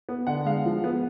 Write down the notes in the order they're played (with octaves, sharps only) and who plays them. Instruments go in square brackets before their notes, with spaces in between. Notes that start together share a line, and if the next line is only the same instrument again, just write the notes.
[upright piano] B3
D3 F#5
G#3 F5
F3
B3